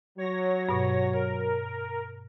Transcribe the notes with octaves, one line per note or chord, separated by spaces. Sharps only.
F#3 C#5 A#6
G2 B2
A#4 C#5